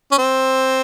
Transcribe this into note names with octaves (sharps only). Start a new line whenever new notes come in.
C#4
C4